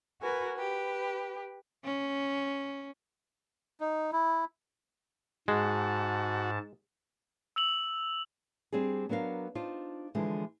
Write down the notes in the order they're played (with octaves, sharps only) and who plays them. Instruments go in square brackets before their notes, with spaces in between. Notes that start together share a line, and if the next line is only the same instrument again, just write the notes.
[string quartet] F#4 A#4 B4 G#5
G4 B4
[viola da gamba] C#4
[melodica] D#4
E4
[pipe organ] G#2 A5 [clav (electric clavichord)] G#3 [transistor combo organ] F#4
[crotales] E6 F7 F#7
[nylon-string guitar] G3 C4 D4 G#4
F#3 B3 D4 A#4 F5
D4 D#4 F4 C5
D3 E3 F3 G#3